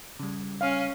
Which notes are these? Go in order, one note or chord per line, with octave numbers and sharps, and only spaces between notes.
C#3 G3
C#4 F5